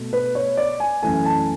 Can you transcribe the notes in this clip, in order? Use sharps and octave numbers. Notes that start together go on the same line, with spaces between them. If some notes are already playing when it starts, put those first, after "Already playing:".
Already playing: B2 A3
B4
C#5
D5
G#5
F#2 E3 A3 G#5
A5